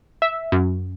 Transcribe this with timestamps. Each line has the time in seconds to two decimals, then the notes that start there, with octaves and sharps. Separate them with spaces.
0.22 E5
0.52 F#2